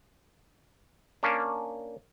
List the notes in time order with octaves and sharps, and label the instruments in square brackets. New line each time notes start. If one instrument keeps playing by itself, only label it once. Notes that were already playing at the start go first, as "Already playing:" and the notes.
[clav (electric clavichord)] A#3 C#4 D4